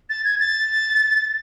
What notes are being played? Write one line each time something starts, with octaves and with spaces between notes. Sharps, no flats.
A6
G#6
A6